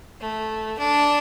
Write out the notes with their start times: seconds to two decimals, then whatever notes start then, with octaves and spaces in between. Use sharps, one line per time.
0.21 A3
0.78 D4